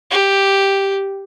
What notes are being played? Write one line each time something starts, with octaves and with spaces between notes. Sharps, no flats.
G4